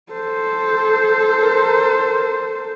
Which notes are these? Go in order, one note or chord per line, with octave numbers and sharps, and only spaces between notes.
A4 C5
A#4